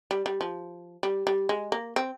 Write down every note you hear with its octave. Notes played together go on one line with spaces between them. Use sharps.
G3
G3
F3
G3
G3
G#3
A#3
C4